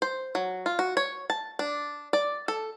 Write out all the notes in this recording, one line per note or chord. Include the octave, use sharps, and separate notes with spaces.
C5
F#3
F4
F#4
C#5
A5
D4
D5
A4